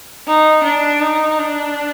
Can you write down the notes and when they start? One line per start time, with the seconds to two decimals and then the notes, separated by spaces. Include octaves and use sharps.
0.27 D#4
0.64 D4
1.01 D#4
1.38 D4